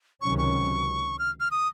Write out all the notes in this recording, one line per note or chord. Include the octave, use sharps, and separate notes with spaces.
C#2 C3 D#3 F#3 C#4 C#6
C#6
F6
F6
D#6